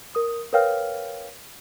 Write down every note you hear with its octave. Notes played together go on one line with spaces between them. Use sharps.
A#4 D#6
A#4 B4 C#5 F5 G5 F6